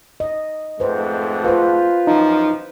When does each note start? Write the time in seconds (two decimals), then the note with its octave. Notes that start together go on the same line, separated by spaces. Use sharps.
0.20 D#5
0.80 F2 G#2 A3 B4 C5
1.44 F4 B4 C5
2.07 F#2 E3 F3 D#4